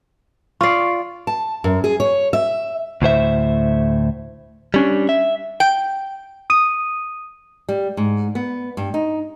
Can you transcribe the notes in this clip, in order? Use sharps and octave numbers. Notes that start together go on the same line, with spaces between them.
F4 D5 C#6 C7
A5
F#2
G#4
C#5
E5
D2 A2 C5 E5
G3 C#4 D4
E5
G5
D#6 D#7
G3
G#2
B3
G2
D#4